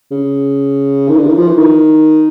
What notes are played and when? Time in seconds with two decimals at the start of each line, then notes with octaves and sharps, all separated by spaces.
0.11 C#3
1.08 D#3
1.17 D3
1.27 D#3
1.33 E3
1.37 F3
1.48 E3
1.58 D#3